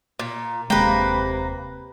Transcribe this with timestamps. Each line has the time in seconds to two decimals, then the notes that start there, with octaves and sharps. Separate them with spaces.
0.19 A#2
0.70 D#1 C3 G#3 A#3 B4 G5